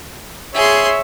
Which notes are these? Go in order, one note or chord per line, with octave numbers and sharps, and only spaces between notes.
G#4 C#5 E5 C6